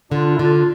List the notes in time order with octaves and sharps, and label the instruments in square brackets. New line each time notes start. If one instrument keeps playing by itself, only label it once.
[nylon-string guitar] D3 [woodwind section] D4 F4
[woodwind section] E4
[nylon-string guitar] D3 [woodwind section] D4 F4